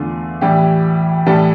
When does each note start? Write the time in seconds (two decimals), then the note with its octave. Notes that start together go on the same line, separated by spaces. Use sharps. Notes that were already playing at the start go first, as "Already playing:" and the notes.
Already playing: E2 D3 A3 F4
0.41 A2 E3 G3 G4
1.26 A2 E3 G3 A4